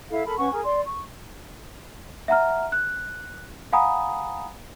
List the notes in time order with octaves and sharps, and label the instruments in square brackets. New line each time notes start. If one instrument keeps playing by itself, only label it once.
[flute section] E4 A4 F5
A4 A#4 B5
C#4 B4 F#5 C#6
G#4 A#4 G#5
D5 C6
C#6
[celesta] E5 F#5 A#5 F6
F#6
F5 F#5 G#5 A#5 B5 D#6